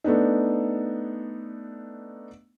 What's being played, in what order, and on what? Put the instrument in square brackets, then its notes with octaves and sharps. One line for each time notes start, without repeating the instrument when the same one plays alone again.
[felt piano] A3 B3 D4 D#4